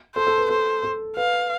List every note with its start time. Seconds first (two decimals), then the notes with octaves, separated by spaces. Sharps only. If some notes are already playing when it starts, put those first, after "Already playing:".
0.15 A4 C5
0.27 A4
0.38 B4
0.50 A4 C5
0.83 A4
1.17 B4 F5